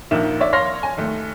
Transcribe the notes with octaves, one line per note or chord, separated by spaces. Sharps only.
A#1 D#2 D#3 A#3 E5 E7
C#5 D5 E5
C#5 F5 C6 F6 A#6
G#5
D#2 A3